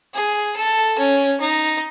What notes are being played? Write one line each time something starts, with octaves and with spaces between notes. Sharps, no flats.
G#4
A4
C#4
D#4